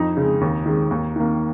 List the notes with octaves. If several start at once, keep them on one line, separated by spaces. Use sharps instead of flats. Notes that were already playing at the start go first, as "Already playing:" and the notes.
Already playing: F2 D#4
C#3 G#3
D#2
D#3 G#3
D#2
D#3 A#3